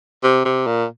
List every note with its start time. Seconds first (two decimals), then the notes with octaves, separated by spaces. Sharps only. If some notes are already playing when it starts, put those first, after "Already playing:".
0.23 C3
0.45 C3
0.67 A#2